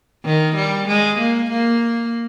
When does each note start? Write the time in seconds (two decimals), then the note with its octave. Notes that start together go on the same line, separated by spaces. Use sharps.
0.25 D#3
0.56 G3
0.88 G#3
1.19 A#3
1.50 A#3